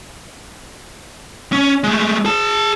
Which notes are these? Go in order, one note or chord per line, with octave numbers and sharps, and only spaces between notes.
C#4
G#3 A3
G#4 A5